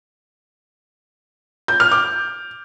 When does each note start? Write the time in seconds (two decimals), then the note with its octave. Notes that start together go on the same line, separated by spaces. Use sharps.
1.68 G6
1.80 F6
1.92 D6